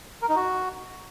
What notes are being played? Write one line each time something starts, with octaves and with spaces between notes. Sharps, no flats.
A#4
D#4
F#4